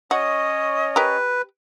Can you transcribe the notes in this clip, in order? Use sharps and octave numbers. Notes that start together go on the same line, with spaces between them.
C#4 F#4 C#5 D#5
G4 A#4 B4